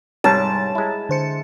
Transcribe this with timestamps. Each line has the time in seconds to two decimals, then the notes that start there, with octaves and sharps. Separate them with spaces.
0.24 C2 G#2 G3 G#4 C#5 A5 A#5
0.75 G#3 E4
1.09 D3 C5 C#7